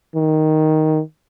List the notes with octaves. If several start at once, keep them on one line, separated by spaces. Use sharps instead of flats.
D#3